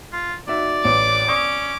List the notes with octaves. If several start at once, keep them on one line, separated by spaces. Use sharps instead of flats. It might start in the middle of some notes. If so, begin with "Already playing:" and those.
F4
D#4 F#4 D5 E5
A1 D6
C#4 D5 C#6 D#6